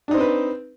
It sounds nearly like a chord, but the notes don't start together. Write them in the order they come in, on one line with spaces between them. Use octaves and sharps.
D4 D#4 C5 C4 B4